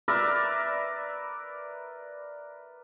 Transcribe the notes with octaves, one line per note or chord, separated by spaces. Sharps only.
A#4 B4 D5 E5